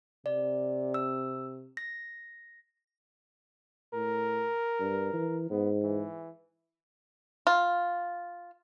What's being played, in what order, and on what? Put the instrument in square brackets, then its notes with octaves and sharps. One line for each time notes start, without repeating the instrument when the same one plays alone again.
[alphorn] C3 [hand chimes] D5
[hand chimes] E6
A#6
[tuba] A2 [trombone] A#4
[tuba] G2
E3
[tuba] G#2 [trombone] B3
[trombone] E3
[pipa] F4